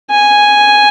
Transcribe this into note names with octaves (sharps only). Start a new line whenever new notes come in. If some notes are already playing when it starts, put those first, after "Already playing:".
G#5